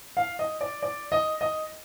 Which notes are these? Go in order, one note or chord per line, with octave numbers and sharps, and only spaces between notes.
F5
D#5
D5
D5
D#5
D#5